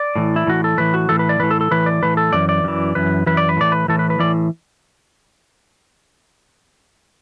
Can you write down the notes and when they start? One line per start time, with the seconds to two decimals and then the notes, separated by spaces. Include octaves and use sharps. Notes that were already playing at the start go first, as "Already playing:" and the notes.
Already playing: D5
0.16 A2 E3
0.36 E4
0.47 A2 E3 F#4
0.64 A4
0.78 A2 E3 B4
0.94 F#4
1.09 A2 E3 A4
1.19 B4
1.29 D5
1.40 A2 E3 B4
1.51 A4
1.61 A4
1.71 A2 E3 B4
1.86 D5
2.03 A2 E3 B4
2.17 A4
2.33 F#2 E3 D5
2.49 D5
2.64 F#2 E3
2.95 F#2 E3 B4
3.26 F#2 E3 B4
3.37 D5
3.49 B4
3.57 A2 E3 D5
3.72 B4
3.88 A2 E3 A4
3.99 B4
4.10 B4
4.19 A2 E3 D5